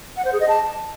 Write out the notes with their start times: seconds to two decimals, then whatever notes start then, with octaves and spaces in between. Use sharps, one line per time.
0.17 F#5
0.25 C5
0.33 G#4
0.41 D#5
0.48 A5